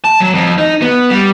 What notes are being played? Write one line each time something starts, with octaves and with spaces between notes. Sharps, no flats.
A5
F#3
F2
D#4
B3
G3